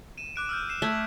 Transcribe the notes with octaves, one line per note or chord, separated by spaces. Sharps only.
D#7 E7
D6 F#6 D7
E6 F6 G6
C7 E7
A3 E6 G#6 B6